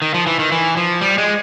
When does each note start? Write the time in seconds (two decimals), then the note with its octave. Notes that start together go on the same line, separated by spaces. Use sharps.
0.02 D#3
0.14 F3
0.27 E3
0.39 D#3
0.52 E3
0.77 F3
1.01 G3
1.18 G#3